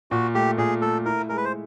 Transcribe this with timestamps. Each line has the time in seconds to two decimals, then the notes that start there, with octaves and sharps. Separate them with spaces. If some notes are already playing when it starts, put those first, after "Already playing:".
0.11 A#2 F#4
0.35 A3 G4
0.58 A#2 G#4
0.82 A3 A4
1.06 E4 A#4
1.29 G#3 A#4
1.37 B4
1.45 C5